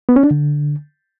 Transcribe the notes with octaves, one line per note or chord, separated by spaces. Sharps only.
B3
C#4
D4
D3